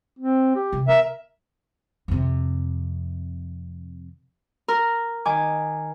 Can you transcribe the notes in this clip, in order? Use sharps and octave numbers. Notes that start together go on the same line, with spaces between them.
C4
G4
C3
B3 A#4 E5
F2 C3
A#4
D#3 G#5 D6